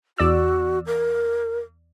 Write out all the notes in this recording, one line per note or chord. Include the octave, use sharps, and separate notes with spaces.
E2 F#4 D5 E6
A#4